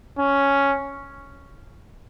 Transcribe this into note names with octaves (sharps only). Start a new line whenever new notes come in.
C#4